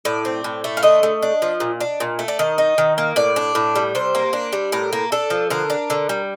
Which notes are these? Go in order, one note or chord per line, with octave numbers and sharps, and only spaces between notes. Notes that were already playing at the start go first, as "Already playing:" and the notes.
A2 D5
C4
A2
A3
F5
D3 D#5
A3
D4
F3
A#2
D4
A#2
A3
D5
D#3 D#5
D#4
D#3
A#3
A2 D5
D4
A2
G3
C3 C5
A#3
D4
G3
A2 A#4
A#3
D4 A4
F3
D3 A#4
D4
D3
G3